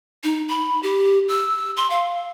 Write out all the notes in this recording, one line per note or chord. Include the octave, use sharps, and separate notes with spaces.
D#4
B5
G4
E6
C6
F5